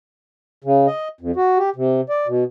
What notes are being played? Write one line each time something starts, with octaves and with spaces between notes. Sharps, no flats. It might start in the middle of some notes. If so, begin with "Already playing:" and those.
C#3
D#5
F2
F#4
G4
C3
D5
B2